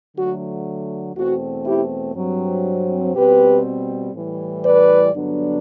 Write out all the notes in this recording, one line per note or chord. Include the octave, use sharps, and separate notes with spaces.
D3 F#3 A3 F#4
E2 B2 A3 C4 F#4
E4 G4
G2 F#3 C4
B2 G3 C4 G4 B4
A2 E3 G3
B4 D5
G2 D3 F#3 B3 D4